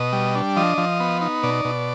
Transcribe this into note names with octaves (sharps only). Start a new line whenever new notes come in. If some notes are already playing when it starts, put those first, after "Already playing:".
Already playing: B2 D#5
G3
D4
F3 D#5
F3
B3
D#4
B2 D5
B2